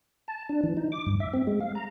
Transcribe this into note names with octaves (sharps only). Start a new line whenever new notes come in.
A5
D4
E3
D#4
D6
G2
E5
C4
G#3
F5
A#5